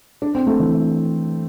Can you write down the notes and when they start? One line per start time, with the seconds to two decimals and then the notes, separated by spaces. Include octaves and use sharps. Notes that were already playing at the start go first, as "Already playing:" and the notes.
0.22 D4
0.35 C4
0.47 A3
0.60 E3